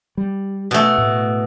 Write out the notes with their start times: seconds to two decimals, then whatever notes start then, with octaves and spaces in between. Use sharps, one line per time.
0.17 G3
0.71 B2 A3
0.98 A2